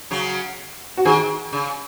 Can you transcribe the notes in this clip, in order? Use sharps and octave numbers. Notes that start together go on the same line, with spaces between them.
C#3 F#3
F#4
D#3 G#4
C#3